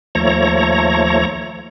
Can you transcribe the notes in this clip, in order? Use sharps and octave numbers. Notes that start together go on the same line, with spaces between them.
D#2 F3 A3 C#5 A#5